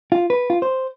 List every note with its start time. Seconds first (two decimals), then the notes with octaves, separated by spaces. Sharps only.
0.12 F4
0.30 B4
0.50 F4
0.62 C5